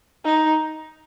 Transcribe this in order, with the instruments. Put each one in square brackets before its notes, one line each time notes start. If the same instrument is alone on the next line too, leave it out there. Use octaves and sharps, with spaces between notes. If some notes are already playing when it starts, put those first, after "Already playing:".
[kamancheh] D#4